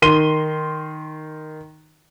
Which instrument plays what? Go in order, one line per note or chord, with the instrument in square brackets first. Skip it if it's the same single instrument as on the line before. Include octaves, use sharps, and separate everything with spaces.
[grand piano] D#3 C6 D#7 G7